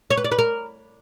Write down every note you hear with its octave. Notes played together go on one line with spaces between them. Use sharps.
C#5
B4
D5
B4
A#4